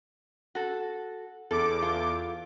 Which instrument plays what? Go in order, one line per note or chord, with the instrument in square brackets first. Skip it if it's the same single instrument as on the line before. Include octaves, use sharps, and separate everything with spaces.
[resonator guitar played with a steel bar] F#4 A4
[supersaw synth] E2 D6 [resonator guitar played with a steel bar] A4
[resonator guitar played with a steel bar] F4 A4